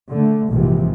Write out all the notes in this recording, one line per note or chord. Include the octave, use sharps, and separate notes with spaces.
D3 A3
A#1 G#2 C3 E3 F3